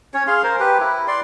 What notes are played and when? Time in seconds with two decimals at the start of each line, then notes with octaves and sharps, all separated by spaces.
0.14 C#4 C#5
0.27 G#4 F5 C6
0.43 A#4 C5
0.60 G4 B4
0.80 E4
1.08 D5 C6